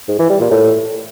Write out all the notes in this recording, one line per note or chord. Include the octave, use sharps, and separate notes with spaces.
G#2
E3
G3
A#2
A2